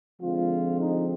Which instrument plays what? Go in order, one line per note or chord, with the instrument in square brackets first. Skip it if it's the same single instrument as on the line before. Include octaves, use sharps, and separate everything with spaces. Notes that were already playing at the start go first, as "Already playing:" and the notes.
[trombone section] D3 F3 G#3 C4 F4
D#4